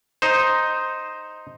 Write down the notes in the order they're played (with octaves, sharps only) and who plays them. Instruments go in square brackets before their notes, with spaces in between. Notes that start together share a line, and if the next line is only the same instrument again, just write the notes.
[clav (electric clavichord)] D#4 C5